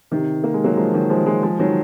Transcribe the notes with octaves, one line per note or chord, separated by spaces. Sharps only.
C3 D#3
A#3
G#3
F#3 A#3
F3 G#3
D#3 F#3
F3 G#3
F3 G#3
F3 G#3
D#3 F#3